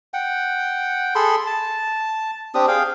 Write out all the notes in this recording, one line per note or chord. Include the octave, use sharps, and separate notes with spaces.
F#5 G5
G#4 A4 B5 C6
A5
C4 D4 G4 D#6
G#4 F5 G5